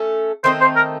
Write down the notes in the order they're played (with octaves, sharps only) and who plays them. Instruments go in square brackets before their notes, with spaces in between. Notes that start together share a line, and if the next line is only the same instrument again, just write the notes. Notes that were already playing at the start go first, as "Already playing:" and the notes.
Already playing: [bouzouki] A3 C#4 A4
[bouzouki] D#3 A3 C4 D#4 [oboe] C5
[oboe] C5
A#4